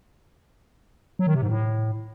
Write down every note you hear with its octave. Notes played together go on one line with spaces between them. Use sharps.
F#3
D#3
C3
G#2
A2